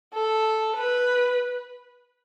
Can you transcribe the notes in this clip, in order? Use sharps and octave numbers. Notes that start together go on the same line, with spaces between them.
A4
B4